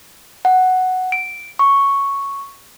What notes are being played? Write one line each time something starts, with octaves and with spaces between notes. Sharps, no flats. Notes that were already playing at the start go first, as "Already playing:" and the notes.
F#5
D7
C#6